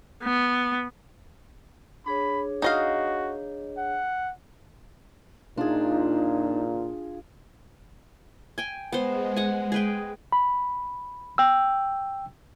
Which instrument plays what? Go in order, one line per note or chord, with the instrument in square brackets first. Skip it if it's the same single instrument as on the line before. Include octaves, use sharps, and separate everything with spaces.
[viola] B3
[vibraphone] D4 G#4 C#5 [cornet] B5
[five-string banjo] D#4 D#5 F5 [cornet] F#4
[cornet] F#5
[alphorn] A#2 [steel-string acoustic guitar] D4 [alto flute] D#4 [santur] F4 G#4
[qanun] G5 G#5
[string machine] G#3 [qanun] B3 C5
[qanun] F#5 G#5
G#4 B4 G5
[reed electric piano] B5
G5 E6